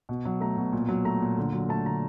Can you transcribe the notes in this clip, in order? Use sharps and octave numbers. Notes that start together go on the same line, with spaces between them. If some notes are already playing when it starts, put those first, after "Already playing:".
B2
F#3
A3 A#5
B2
A#2
F#3
A3 A#5
A#2
D3
F#3
A3 A5
D3 A#5